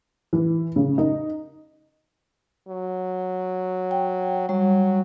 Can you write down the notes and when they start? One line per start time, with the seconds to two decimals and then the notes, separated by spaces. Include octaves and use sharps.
0.33 E3
0.76 C#3
0.98 D#4
2.69 F#3
3.91 G5
4.49 F#3 G3